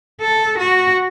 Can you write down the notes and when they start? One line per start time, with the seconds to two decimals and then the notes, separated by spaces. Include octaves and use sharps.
0.21 A4
0.58 F#4